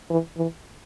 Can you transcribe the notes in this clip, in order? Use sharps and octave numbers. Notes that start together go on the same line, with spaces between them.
E3
E3